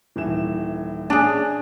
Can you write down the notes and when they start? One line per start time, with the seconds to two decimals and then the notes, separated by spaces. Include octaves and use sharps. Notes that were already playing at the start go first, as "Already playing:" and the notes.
0.16 D#1 E3 E7
1.10 C#4 D4 G#4